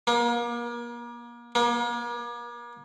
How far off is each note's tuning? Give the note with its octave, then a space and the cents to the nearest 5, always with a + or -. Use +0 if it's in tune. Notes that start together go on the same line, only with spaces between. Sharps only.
A#3 +35
A#3 +40